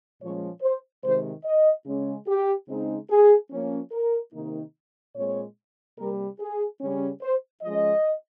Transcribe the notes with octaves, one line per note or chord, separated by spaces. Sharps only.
A#2 F3 G#3 C#4 C#5
C5
C3 D#3 G#3 C5
D#5
C#3 G#3 C#4
G4
C#3 G#3 C4 D#4
G#4
F3 A#3 C#4
A#4
C3 D#3 A#3 D#4
A#2 G#3 C4 C#5
C3 G3 A#3 A#4
G#4
C#3 G3 C#4
C5
F3 G#3 C#4 D#5